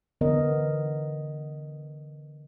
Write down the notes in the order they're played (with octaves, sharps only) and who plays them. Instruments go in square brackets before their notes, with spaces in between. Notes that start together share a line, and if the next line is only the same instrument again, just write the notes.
[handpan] D3 E3 B3 A#4 D#5